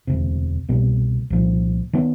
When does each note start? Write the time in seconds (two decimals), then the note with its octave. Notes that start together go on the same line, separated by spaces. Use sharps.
0.07 E1 D2 C3
0.69 C2 B2 G3 A#3
1.30 C2 A#2 F3
1.93 D#3 F#3 B3